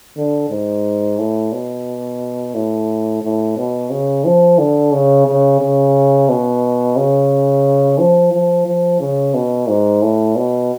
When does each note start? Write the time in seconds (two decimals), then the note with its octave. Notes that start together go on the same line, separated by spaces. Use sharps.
0.17 D3
0.50 G#2
1.18 A2
1.53 B2
2.55 A2
3.22 A2
3.57 B2
3.90 C#3
4.25 F3
4.59 D3
4.92 C#3
5.27 C#3
5.60 C#3
6.29 B2
6.96 C#3
7.99 F3
8.32 F3
8.67 F3
9.00 C#3
9.34 B2
9.69 G#2
10.02 A2
10.36 B2